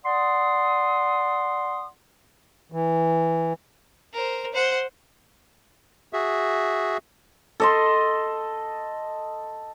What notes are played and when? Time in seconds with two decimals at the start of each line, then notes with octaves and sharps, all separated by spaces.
0.05 D5 F#5 C6 D#6
2.72 E3
4.13 A#4 C5
4.53 C5 F#5
6.13 F#4 G#4 E5
7.60 A4 D#5 C6